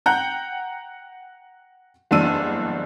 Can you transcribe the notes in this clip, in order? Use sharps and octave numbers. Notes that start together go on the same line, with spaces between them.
F#5 G5 A#5 F#6 G6
F#1 E2 G2 D4 E6 D#7